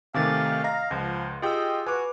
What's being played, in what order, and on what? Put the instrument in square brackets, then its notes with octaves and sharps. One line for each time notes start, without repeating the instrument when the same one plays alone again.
[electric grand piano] C3 D#3 A3 [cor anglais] F5 [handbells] G#5 D6 A6
[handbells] D#5 [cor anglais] F5 [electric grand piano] A#5 A#6
[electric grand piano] C#2 [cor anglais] F3 [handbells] F#5 C6
[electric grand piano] F4 G4 G5 [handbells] G#4 E6 [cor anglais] D#5
[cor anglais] F#4 [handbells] B4 [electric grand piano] G#5 D6